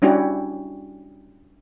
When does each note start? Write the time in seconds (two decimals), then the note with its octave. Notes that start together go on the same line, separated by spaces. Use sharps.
0.02 G3 C#4 D4 E4 F#4 G4